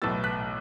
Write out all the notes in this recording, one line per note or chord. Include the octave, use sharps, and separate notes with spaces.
B1 A2 E3 E6 A6
F#6 B6